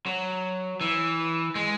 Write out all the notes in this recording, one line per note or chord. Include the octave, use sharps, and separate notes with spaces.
F#3
E3
G#3